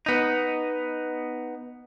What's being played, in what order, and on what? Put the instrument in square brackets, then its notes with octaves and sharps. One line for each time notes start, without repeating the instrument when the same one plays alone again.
[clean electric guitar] B3 D#4